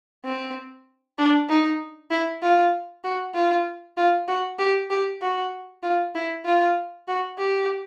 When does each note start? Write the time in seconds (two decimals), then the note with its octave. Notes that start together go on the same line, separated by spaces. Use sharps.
0.25 C4
1.18 D4
1.49 D#4
2.11 E4
2.43 F4
3.04 F#4
3.35 F4
3.97 F4
4.28 F#4
4.59 G4
4.90 G4
5.22 F#4
5.83 F4
6.15 E4
6.45 F4
7.08 F#4
7.39 G4